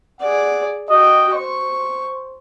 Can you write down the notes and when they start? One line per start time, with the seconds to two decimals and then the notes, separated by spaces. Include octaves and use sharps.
0.21 G#4 D5 F#5
0.90 F#4 D#5 G5
1.34 C5 C#6